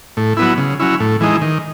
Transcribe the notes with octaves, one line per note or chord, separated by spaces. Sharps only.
A2
F#3 B3 E4
C#3
F#3 C#4 E4
A2
E3 G#3 D#4
D#3